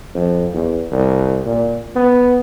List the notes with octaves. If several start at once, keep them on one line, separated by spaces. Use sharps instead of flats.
F2
E2
C2
A#2
B3